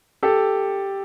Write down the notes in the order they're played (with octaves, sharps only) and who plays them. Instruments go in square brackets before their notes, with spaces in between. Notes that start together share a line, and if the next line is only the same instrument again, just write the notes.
[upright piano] G4 A4